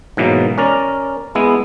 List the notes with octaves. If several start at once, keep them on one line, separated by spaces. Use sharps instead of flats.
G#2 B2 E3 F#3 A#3
C#4 A#4 D5
G#3 B3 E4